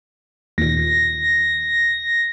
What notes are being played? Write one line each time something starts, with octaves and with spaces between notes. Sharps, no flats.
D#2 A#2 A#6